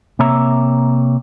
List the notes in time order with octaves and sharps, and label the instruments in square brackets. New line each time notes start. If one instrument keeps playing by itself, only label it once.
[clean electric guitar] C3 A#3 C#5 E5 A#5